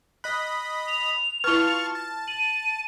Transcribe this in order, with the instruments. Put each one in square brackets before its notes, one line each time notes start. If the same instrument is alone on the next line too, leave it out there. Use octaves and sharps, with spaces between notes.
[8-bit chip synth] D#5 B5 [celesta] F#6
[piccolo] F7
[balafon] E4 B4 [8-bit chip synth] F4 A5 C#6 [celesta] F6 G7
[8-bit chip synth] A5
[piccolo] D#7 [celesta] F#7